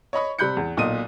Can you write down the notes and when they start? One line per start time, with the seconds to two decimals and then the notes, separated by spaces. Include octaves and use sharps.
0.13 C#5 D#5 B5 C#6
0.39 C3 G3 B5 F#6 G6 C#7
0.57 E2
0.77 B1 A#2 D#5 D#6 D#7